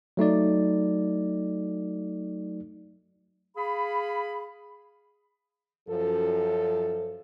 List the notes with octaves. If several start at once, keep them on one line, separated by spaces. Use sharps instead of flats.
F#3 A3 D#4 D5
G#4 F5 B5
F#2 F3 A4